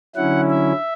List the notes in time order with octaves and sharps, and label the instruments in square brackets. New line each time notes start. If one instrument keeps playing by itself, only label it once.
[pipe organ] D3 F#3 C#4 E4 F#5
E5